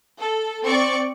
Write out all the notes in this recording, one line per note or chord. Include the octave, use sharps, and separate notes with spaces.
A4
C4 D5 C#6